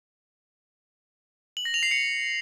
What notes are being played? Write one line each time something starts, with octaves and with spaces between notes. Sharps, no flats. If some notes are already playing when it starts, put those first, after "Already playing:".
F#7
A#6
F7
C7
C#7